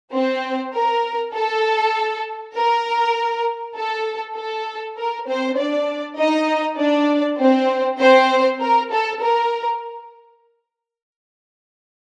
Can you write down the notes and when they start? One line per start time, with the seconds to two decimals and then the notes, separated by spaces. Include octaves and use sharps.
0.12 C4 C5
0.73 A#4
1.34 A4
2.55 A#4
3.76 A4
4.36 A4
4.97 A#4
5.27 C4 C5
5.58 D4 D5
6.18 D#4 D#5
6.79 D4 D5
7.39 C4 C5
7.99 C4 C5
8.60 A#4
8.91 A4
9.21 A#4